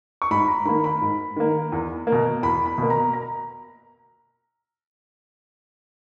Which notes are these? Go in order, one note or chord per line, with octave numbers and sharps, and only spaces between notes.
C#6
G#2 B5
A#5
D#3 A#3 B5
B5
G#2
D#3 A#3
E2
A#3
B2
E2 B5
B5
B2 A#3
A#5
A#5